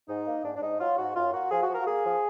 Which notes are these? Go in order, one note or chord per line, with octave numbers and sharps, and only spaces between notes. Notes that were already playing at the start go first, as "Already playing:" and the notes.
G#2 D#4
A#3
G#2 D4
D4
G#2 D#4
F#3 F4
G#2 F#4
F#2 F4
A#3 F#4
F3 G#4
F3 F#4
A#4
F#4
A#3 G#4
F3